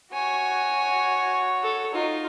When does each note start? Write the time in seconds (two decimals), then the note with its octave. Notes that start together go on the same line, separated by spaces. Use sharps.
0.13 F#4 C#5 G#5
1.63 A4
1.93 D#4 F4